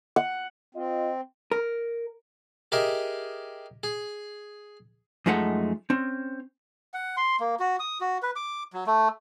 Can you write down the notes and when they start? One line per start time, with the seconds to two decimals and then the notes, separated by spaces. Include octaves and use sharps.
0.16 F#5
0.75 C4 F4 D#5
1.52 A#4
2.72 G4 G#4 A#4 D#5 E5
3.83 G#4
5.26 F#2 F3 G#3 A3 D#4 F#5
5.90 C4 C#4
6.94 F#5
7.17 C6
7.40 A#3
7.60 F#4
7.80 D#6
8.01 F#4
8.22 B4
8.36 D6
8.73 F#3
8.87 A3